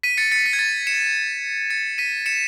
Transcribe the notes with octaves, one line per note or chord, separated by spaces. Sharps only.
B6 D#7
A6 C#7
A6 C#7
B6
G#6
A6
C#7 E7
A6 C#7
B6 D#7
C#7 E7